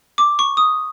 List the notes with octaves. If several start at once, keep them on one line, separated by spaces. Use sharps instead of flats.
D6
C#6
D#6